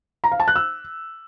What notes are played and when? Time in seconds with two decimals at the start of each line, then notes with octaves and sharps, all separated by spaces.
0.24 A#5
0.32 F5
0.40 A5
0.48 F#6
0.56 E6